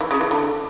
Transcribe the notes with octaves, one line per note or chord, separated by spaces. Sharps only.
E3
C#3
E3
D3